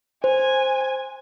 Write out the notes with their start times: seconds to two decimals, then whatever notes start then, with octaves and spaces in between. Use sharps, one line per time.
0.24 C5 G#5